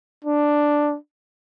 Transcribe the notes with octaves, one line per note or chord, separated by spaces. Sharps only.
D4